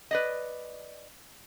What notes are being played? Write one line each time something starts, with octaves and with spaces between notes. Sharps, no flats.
B4 D5 D#5